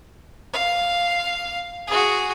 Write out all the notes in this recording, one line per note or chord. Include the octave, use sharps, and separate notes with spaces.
F5
F#4 G#4